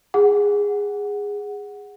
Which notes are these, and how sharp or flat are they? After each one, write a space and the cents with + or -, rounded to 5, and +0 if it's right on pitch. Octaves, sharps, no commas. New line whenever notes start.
G#4 -15 F#5 +0